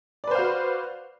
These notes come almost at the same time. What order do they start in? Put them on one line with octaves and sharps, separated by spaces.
D5 B4 C5 F5 F#4